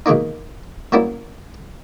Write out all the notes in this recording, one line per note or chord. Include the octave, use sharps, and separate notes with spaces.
B2 D#3 G#3 A#3 D#4
F#3 G3 A#3 B3 C#4 E4